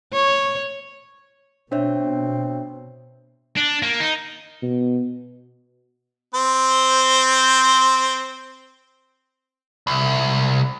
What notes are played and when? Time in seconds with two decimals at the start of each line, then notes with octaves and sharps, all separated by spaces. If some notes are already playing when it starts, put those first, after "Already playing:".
0.13 C#5
1.72 B2 C4 D4 C#5 E5
3.57 D4
3.83 A#3
4.00 D#4
4.62 B2
6.34 C4 C5
9.87 C2